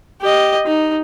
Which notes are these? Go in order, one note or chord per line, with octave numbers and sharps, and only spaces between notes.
G4 D#5
D#4